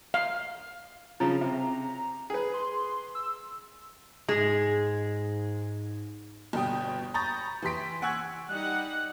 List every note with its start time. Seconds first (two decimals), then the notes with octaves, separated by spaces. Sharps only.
0.14 F5
1.20 C#3 F3 A#5
1.41 C3
2.30 G#4 B4
2.54 C6
3.15 E6
4.28 G#2 G#3 G#4
6.53 G1 B2 G3 G5 D#6
7.14 A#5 B5 C#6 D#6 G6 A6
7.62 E3 G4 C6 B6 D7
8.02 F#5 G#5 C#6 E6 F#6 G#6
8.49 G3 D#4 F#5 F#6